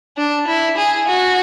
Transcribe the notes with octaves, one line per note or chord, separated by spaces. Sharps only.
D4
E4
G#4
F#4